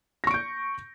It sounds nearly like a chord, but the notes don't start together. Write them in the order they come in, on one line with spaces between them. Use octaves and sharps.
A#6 C#6 D7 G6